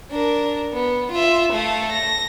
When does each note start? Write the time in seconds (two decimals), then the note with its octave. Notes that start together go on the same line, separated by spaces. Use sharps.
0.11 D4 A#4
0.73 B3
1.12 F4 E5
1.53 A3 F5
1.92 A#6